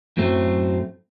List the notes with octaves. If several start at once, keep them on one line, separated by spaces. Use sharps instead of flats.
F#2 A2 F#3 A3 C4